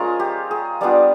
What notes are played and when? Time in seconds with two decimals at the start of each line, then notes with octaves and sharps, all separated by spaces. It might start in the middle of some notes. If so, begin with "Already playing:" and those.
Already playing: F3 G#3 C#4 F4 A#4
0.20 G4
0.51 G#4
0.81 G3 B3 D4 F4 D5